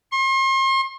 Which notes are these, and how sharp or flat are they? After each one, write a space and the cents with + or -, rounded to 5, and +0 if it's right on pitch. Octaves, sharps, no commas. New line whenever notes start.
C6 +40